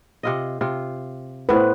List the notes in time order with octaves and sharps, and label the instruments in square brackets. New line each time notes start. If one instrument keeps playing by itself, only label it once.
[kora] C3 F4 D#5
C3 F4
[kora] A2 B3 [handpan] B4 C5